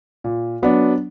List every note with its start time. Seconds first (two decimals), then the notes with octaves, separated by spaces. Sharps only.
0.24 A#2
0.62 F#3 B3 D4